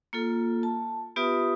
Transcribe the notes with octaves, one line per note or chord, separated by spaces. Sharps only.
A#3 F4 A4
A5
B3 F4 G4 B4 E5 D#6